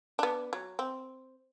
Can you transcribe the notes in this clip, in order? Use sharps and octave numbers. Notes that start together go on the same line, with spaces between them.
B3 D4
F#3
C4